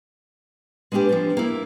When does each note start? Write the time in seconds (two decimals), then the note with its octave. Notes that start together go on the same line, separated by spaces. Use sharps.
0.92 G#3 B3 C#4 D4 G4 B4
1.09 F3 C4 D4
1.37 A#3 E4